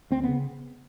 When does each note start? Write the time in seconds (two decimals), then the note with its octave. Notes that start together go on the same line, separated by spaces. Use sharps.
0.11 D2 C4
0.23 C#3 B3